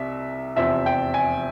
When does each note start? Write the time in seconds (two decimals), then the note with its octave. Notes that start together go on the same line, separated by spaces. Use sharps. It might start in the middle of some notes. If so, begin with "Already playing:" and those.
Already playing: C2 C3 E5
0.56 F1 E2 C3 F3 C4 E5
0.86 G5
1.14 G#5